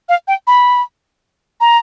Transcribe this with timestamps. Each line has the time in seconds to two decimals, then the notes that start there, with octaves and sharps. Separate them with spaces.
0.09 F5
0.28 G5
0.47 B5
1.61 A#5